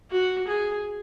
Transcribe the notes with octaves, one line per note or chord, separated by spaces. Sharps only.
F#4
G#4